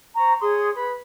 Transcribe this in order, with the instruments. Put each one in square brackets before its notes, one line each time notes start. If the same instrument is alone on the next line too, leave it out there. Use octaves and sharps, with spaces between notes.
[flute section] C5 A#5 C#6
G#4 C#5 C6 D#6
B4 B5